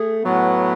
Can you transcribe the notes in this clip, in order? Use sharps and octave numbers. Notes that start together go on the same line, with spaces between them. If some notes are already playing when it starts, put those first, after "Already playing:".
Already playing: A3 G#4
A2 F#3 B3